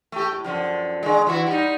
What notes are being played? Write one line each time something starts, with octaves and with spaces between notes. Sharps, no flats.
A3 G4
A2
F#2 D3 F3
D3 G#3
E3 E4 F#4
G3 D#4